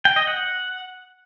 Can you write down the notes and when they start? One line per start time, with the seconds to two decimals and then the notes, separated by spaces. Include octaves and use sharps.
0.05 G5
0.16 D#5
0.27 F#5